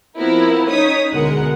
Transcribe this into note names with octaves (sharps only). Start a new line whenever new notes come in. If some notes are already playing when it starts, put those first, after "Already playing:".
F3 B3 C4 E4 A#4
C#4 D#4 C#5 D#6 B6
D2 B2 G#3 A#4 F#5